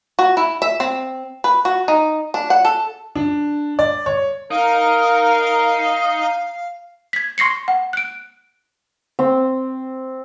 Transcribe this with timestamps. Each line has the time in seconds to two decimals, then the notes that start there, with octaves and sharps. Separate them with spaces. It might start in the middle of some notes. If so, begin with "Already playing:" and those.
0.19 F#4
0.37 E4
0.62 E5
0.80 C4
1.44 B4
1.65 F#4
1.88 D#4
2.34 D4
2.50 F#5
2.65 A4
3.16 D4
3.79 D5
4.06 C#5
4.51 D#4 A#4 F5
7.13 G#6 B6
7.38 C6 C#6 A#6 C7 C#7
7.68 F#5
7.93 F#6 D7
9.19 C4